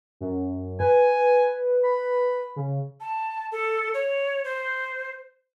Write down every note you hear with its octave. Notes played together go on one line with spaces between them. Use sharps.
F#2
B4 G#5
B5
C#3
A5
A4
C#5
C5